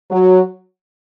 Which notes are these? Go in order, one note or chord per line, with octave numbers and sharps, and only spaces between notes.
F#3